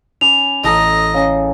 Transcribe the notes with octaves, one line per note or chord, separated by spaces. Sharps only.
C#4 G#5 B5 D6 F7
A1 A4 D#5 A5 A#5
C#3